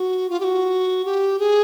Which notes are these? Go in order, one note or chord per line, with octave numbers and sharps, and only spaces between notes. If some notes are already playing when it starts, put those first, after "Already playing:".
Already playing: F#4
F4
G4
F#4
G4
G#4